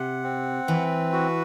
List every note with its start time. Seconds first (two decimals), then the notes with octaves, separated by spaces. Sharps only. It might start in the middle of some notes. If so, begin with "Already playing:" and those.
Already playing: C3 F#5
0.23 C4
0.68 E3 B4
1.12 F#4